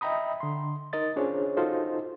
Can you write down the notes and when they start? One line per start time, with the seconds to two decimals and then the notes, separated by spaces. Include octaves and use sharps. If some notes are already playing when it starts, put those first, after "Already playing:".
0.01 D#5 E5 G5 A#5 B5 D#6
0.40 D3 C6
0.93 D#4 A#4 D#5 A6
1.16 C#4 D4 F4 G#4 C5 C#5
1.57 D#4 F4 F#4 A4 C5 D#5